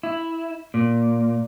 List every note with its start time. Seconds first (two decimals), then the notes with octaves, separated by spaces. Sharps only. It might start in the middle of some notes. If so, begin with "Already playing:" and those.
0.03 E4
0.74 A#2